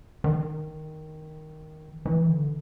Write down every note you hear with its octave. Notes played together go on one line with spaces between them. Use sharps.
D#3
E3
D3